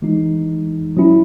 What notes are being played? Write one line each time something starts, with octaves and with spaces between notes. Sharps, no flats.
E3 G#3 D#4
F#3 C#4 E4